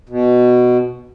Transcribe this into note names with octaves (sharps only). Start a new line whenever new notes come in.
B2